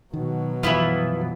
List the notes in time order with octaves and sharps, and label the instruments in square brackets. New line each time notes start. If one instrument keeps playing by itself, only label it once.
[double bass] B2 F#3 [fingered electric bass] D#3
[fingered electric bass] F#2 F3 G3 [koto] E3 F4 [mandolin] B3 E4